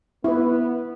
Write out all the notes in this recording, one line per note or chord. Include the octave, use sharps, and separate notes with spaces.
B3 E4 B4